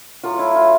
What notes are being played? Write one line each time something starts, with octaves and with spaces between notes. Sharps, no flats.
A2 F#3 A3 F4
E4
F4